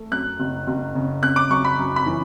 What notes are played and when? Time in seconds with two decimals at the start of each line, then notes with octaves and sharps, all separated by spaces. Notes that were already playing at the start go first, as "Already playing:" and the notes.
Already playing: A3
0.11 F#2 F#6
0.40 F#1
0.67 F#1
0.95 C#3
1.22 C#3 F#6
1.36 D6
1.50 F#2 C#6
1.65 B5
1.79 F#2
1.96 B5
2.06 E3